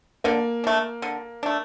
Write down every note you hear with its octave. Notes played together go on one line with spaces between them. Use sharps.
D3 A#3
A3 D4
D3
A3 D4